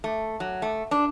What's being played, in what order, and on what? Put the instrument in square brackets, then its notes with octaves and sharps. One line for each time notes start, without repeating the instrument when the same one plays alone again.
[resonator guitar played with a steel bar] A3
F#3
A3
D4